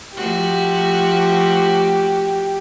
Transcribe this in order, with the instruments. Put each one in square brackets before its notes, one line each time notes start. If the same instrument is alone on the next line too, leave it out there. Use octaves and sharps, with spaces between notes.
[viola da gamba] F3 A3 F#4 [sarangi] G4